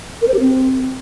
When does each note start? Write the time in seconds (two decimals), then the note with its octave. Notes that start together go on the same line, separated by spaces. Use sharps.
0.22 A#4
0.28 C5
0.34 G4
0.40 C4